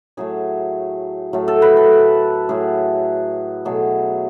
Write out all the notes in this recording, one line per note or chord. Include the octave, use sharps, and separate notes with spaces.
A2 F#3 A3 G#4
A2 F#3 A3
A4
B4
A4
A2 F#3 A3 G#4
B2 F#3 A3 G#4